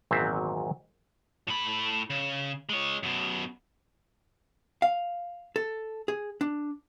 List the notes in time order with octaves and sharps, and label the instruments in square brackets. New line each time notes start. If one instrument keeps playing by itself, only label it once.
[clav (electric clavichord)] G#1 E2 A#2 F#3 C4 E5
[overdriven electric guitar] A2 B5
C#3
G#3 C#5
F#2 B2
[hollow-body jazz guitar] F5
A4
G#4
D4